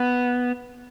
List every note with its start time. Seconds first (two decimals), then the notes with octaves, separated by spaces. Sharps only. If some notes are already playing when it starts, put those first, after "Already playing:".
Already playing: B3